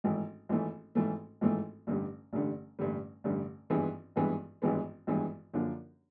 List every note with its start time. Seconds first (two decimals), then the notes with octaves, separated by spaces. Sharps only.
0.04 G#1 G#2 E3 A3
0.49 G#1 G#2 E3 A3
0.95 G#1 G#2 E3 A3
1.41 G#1 G#2 E3 A3
1.87 A1 G2 D3 G3
2.33 A1 G2 D3 G3
2.79 A1 G2 D3 G3
3.24 A1 G2 D3 G3
3.70 G#1 G2 E3 G#3 B3
4.16 G#1 G2 E3 G#3 B3
4.62 G#1 G2 E3 G#3 B3
5.07 G#1 G2 E3 G#3 B3
5.54 F#2 D3 F3 A#3 D4